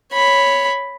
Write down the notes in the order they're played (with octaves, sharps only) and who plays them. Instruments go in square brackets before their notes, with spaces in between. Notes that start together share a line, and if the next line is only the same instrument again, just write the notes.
[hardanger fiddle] C#5 B5